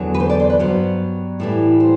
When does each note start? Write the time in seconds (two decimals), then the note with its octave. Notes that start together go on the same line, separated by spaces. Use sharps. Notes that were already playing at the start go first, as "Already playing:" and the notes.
Already playing: E2 D3 F#3
0.14 B4
0.20 C5
0.30 D5
0.40 C5
0.50 B4
0.59 G2 F#3 B3 C5
1.40 A2 E3 G3
1.80 C5